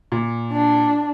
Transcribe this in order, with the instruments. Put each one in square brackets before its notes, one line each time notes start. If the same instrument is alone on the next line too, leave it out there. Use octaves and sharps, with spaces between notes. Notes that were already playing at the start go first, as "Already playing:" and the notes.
[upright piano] A#2
[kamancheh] D4